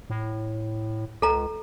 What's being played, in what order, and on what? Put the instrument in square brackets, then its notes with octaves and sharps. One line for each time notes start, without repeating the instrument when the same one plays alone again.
[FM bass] A2
[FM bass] C#2 [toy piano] A4 A#5